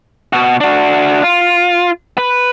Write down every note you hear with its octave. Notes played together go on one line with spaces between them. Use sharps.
B2 F#4
D4 F#4
F4
B4